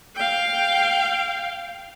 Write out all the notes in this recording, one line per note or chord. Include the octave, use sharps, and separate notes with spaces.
F5 G5